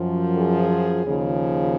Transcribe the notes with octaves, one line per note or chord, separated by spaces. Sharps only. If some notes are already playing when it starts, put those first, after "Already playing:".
Already playing: F#2 F3
G#4
D#2 C#3 F3